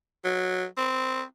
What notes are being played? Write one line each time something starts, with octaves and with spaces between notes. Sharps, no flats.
F#3
C4